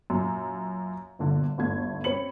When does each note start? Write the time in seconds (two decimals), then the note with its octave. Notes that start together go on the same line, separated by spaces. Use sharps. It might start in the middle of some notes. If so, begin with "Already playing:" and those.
0.10 F#2 A#2
1.19 G1 A#2 D3
1.58 G1 D#2 A3 G#6
2.04 C4 C#4 B5 C#7 F#7